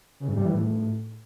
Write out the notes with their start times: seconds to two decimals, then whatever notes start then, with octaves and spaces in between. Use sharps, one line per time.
0.20 C#3
0.28 G2
0.37 G3
0.45 E3
0.53 A2